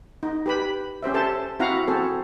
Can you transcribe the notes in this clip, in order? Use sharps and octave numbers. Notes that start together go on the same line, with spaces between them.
D#4
G4 B4 B5
C#4 G4 C5 E5
A4 C5 E5 A5
C4 E4 F#4 F5 F#5 A#5
C4 F#4 G#4 A4 C5